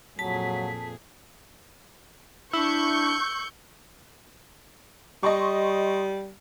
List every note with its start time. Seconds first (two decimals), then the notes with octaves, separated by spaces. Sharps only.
0.19 F2 A#2 F#3 G#4 A5 B6
2.53 D4 E4 C#6 E6 G6
5.23 G3 D#5 C6 C#6